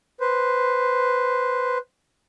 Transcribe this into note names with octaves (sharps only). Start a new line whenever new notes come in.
B4 C5